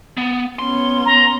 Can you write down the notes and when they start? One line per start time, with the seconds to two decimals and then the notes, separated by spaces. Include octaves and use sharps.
0.17 B3
0.59 B3 C#4 C6
1.05 A#5